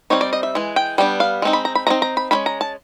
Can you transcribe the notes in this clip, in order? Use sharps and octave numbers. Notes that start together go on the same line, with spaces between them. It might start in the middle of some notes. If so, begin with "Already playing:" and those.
G3 C4 D#4 C#5
D5
D#5
E5
E3 G#3
G5
G3 B3 D4 G5
F5
G#3 C4 D#4
B5
A#5
B5
E3 G#3 C4 D#4 A#5
A#5
B5
D#3 G#3 C#4 B5
A#5
A5